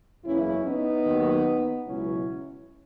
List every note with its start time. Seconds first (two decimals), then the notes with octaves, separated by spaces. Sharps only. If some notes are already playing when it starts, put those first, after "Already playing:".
0.24 F#1 E2 C#3 E3 C#4 E4
0.64 B3 D#4
1.05 D#2 D#3 F#3
1.86 C#2 B2 F#3 C#4 E4